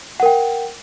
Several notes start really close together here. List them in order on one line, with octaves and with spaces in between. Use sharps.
F#5 A#4 G5